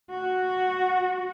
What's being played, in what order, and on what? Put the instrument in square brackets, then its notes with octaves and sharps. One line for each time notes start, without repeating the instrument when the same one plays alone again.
[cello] F#4